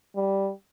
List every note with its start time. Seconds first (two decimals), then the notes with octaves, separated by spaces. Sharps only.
0.15 G3